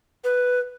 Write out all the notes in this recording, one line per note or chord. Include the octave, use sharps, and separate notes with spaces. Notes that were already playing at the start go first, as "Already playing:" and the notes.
B4